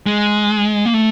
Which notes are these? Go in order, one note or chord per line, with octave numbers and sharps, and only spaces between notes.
G#3
A#3
A3